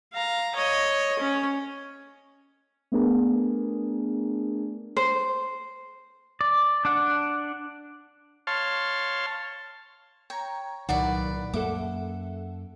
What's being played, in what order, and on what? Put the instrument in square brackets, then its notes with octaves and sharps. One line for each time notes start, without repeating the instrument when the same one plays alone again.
[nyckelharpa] F5 A#5
C#5 D#5
C#4
[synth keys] A3 B3 D4 G#4 A#4
[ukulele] C5
[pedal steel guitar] D5
D4 D5 F#5
[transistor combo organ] C#5 F5 A5 C6
[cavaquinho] C#5 [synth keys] G5 A#5
[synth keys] C2 A#2 F#3 [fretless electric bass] D#3 [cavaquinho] B4 D5 F#5
[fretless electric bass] F#2 A#3 [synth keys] A4 E5 F#5 [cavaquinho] D6